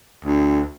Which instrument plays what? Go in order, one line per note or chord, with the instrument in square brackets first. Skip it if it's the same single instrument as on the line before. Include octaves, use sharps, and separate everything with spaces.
[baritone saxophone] D2